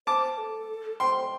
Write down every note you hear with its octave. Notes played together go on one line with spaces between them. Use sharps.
C5 A5 D6
A4
C5 G5 C6